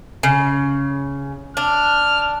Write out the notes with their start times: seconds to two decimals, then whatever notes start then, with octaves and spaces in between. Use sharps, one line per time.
0.23 C#3
1.57 D4 F6